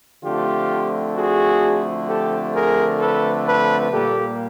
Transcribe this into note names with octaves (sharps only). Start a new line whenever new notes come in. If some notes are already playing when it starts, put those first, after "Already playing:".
D3 F3 A3 C4 F4 G4
F#4 G#4
G4 A4
G#4 A#4
A4 B4
A4 B4
A#2 G3 A#3 G4 A4